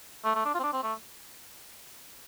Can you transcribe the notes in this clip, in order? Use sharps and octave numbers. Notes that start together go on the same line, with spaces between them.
A3
A3
D4
F4
C4
D4
C4
A3